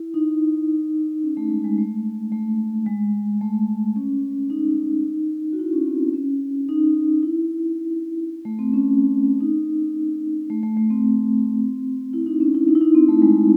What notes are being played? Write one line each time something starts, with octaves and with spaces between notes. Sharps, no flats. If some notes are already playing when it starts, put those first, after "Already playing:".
Already playing: E4
D#4
C#4
A3
G#3
G#3
A3
A3
G#3
A3
C#4
D#4
F#4
E4
C#4
C4
C#4
D#4
E4
A3
C4
C#4
D#4
A3
A3
A3
C4
E4
D#4
C#4
E4
D#4
E4
D#4
C4
A3
G#3